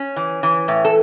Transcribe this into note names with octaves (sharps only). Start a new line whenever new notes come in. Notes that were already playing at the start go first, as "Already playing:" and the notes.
Already playing: C#4
E3
E3
A2
A4